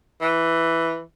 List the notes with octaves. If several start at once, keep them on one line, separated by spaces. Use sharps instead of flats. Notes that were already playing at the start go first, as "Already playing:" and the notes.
E3